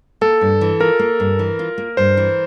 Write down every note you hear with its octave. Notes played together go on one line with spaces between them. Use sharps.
A#3 A4
G2
E3
F4 A#4
A#3
G2
E3
F4
A#3
G2 C5
E3